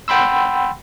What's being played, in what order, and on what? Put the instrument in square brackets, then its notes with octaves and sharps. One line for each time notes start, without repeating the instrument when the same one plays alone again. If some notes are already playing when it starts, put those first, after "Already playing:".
[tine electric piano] F#5 G5 B5 C6 E6